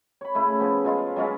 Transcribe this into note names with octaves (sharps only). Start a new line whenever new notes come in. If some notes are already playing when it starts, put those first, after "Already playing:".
C#5 B5
C#3 A3 E4
F3 B3 G#4
F3 G#3 F4
F#3 G#3 C#4 F4